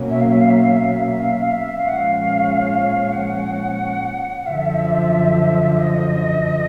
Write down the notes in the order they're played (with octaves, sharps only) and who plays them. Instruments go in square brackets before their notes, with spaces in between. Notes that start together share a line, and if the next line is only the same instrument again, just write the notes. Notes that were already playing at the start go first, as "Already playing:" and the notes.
Already playing: [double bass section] B2 F#3 A#3 C#4
[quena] E5
F5
E5
F5
E5
F5
E5
F5
E5
F5
E5
F5
E5
F5
E5
[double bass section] A#2 F3 G#3 C#4 [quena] F5
[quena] F#5
F5
F#5
[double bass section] F#2 D3 F3 [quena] E5
[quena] D#5